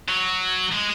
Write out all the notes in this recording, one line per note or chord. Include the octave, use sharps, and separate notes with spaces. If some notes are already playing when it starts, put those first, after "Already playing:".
F#3
G#3